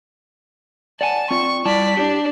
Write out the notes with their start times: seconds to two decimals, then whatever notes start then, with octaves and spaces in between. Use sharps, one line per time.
1.01 D5 F#5 G#5 A5
1.31 C4 F4 D5 C#6
1.65 G3 E4 D5 A5 B6
1.97 D4 G4